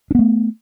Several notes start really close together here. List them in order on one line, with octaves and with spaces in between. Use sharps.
D4 B3 A3